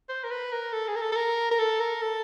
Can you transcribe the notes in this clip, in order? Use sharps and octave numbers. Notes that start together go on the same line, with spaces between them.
C5
A#4
B4
A#4
A4
G#4
A#4
A4
A4
A#4
A#4
A4
A#4
A4